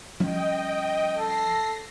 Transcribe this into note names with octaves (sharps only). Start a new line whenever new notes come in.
F3 G3 C#4 D#5 G5
A4 A#6 C7